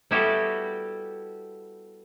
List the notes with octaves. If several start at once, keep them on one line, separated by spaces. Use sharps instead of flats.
G3 B3 E4 F#4 G4 A4